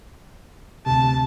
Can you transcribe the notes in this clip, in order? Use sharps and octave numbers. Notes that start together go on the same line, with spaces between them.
D2 C3 A5